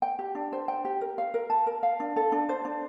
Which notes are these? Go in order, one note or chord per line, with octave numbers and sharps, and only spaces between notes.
G5
G4
D4
C5
G5
G4
A#4
F5
A#4
A5
A#4
F5
D4
A4
D4
C5
D4